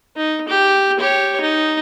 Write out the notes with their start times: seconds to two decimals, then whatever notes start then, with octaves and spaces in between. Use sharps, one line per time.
0.16 D#4
0.48 G4
0.99 G4 C#5
1.41 D#4